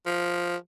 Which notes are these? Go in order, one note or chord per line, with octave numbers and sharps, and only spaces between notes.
F3